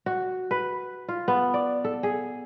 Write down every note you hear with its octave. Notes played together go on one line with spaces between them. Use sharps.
F#4
B4
F4
B3
D5
A4
G#4